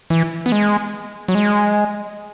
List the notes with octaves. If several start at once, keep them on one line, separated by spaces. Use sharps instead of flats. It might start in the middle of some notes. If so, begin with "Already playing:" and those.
E3
B3
G#3
F#3
G#3